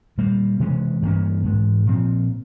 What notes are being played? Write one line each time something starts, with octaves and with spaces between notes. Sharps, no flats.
A#2 G3 A#3
C3 E3 G#3 C#4
G2 E3 A#3 C#4
G#2 E3 G#3
A#2 F3 C4